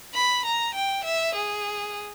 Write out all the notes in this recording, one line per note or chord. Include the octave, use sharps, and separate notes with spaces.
B5
A#5
G5
E5
G#4